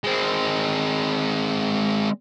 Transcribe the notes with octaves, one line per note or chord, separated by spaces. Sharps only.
G#3 C4